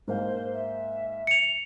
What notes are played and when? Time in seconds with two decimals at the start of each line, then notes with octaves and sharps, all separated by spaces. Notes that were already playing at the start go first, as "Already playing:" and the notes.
0.08 G#2 A#3 C5 F5
0.53 E5
1.27 C#7 F7